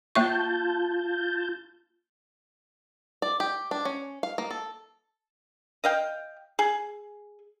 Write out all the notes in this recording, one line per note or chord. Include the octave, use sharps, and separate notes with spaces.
A#3 F4 E5 A5 C#6 G6
D5
G4
D4
C#4
F5
A#3
A4
D#5 F5 G5
G#4